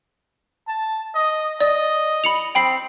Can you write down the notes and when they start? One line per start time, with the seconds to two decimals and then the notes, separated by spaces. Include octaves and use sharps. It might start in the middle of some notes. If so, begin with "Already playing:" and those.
0.68 A5
1.15 D#5
1.61 D5 D#5
2.24 B5 C#7 F7
2.55 C4 G5 B5 C7